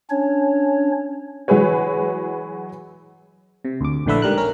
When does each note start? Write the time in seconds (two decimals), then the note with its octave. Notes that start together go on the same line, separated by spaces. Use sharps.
0.10 C#4 D4 C#5
1.48 E3 F#3 G#3 G#4 B4 C#5
3.65 C3
3.81 D2 D6
4.06 A#1 A2 D3 A3 B4 E5
4.22 G#2 G3 A#4 F#6
4.37 C#4 A#4